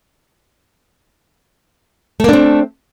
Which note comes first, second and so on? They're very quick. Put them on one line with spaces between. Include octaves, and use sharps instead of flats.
A3 A#3 D4 C4